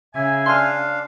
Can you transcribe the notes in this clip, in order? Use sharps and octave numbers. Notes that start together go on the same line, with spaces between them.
C#3 E5 G#5
D4 F5 C6 F6